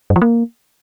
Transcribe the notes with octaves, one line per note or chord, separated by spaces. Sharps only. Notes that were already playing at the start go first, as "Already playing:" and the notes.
G2
F3
A#3